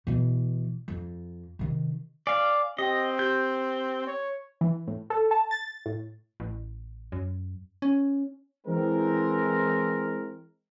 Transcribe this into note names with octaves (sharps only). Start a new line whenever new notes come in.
B2 E3
F2
C3 D#3
D5 F5 G#5
C4 G4 D#5 G5
G4 G6
C#5
E3
A2
A4
A5
A6
A2
A1
F#2
C#4
E3 G#3 C4 A#4